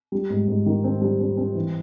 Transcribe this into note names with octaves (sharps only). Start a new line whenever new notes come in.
G3
G#2
G#2
D#3
C4
G3
C4
C4
E3